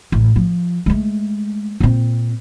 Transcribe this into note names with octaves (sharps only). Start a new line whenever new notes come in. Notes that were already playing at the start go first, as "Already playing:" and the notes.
A1
F3
G#3 A3
A#2 C4